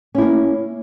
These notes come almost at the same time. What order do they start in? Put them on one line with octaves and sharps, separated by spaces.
C#4 E4 A#3